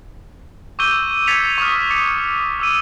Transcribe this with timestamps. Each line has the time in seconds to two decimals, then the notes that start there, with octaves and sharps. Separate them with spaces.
0.79 C#6 D6 E6 G6 D#7 G7
1.27 G#6 A6 B6 C#7 F7
1.58 C#6 D#6 F6
1.90 D6 A6 C#7
2.60 D6 E6 D#7